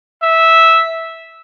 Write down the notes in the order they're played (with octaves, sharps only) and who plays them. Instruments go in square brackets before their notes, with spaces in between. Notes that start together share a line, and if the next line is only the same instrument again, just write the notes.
[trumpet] E5